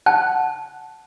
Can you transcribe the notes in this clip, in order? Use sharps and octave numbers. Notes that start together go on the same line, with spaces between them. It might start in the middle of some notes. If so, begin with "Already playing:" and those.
F#5 A5